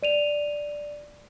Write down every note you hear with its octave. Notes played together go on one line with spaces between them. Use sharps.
D5 D#7 F7